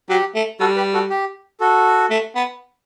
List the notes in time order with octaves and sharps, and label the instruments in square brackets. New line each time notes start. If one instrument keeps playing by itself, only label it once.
[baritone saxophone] F#3 [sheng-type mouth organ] G4
[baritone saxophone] A3
[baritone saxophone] G3 [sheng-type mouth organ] F#4 A4
[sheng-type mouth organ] G4 B4
F#4 A4
G4
F#4 A4
[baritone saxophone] A3
B3